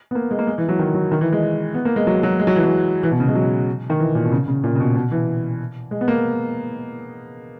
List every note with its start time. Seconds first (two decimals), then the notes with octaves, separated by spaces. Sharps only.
0.11 B3
0.15 A#3
0.31 G#3
0.39 A#3
0.47 G#3
0.58 E3
0.69 F#3
0.79 D#3
0.94 F#3
1.11 D#3
1.21 E3
1.32 G#3
1.74 B3
1.85 A#3
1.96 G#3
2.07 F#3
2.23 F#3
2.40 G#3
2.47 F#3
2.56 E3
2.64 F#3
3.03 E3
3.11 B2
3.20 C#3
3.27 G#3
3.35 F#3
3.90 D#3
3.99 E3
4.15 A#2
4.24 B2
4.32 C#3
4.48 C#3
4.64 A#2
4.75 C#3
4.80 B2
4.95 B2
5.12 E3
5.91 G#3
6.01 B3
6.08 A#3